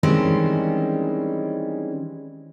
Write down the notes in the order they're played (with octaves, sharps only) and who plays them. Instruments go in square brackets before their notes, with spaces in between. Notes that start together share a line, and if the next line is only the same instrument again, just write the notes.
[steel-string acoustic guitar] D#3 E3 G3 G#3 C4 C#4